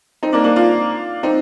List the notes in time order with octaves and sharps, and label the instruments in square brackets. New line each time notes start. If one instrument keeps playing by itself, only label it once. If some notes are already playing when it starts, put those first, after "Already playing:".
[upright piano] C4 D#4
A#3 D4
A#3 D4
D4 F4
C4 D#4